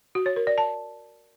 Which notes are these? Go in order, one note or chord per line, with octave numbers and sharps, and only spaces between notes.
F#4
C#5
A#4
D5
A5